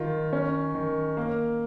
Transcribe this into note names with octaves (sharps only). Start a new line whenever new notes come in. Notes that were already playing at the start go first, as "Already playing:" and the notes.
Already playing: D#3 F4
C#4
D#3
A#3